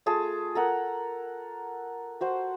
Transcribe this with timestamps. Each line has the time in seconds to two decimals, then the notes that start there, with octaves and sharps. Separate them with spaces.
0.06 A3 F4 G#4 A5
0.55 A4 A#4 F#5
2.21 F#4 C5 F#5